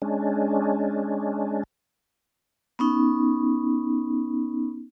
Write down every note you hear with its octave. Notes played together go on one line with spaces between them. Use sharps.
G#3 C#4 D4
B3 C#4 D#4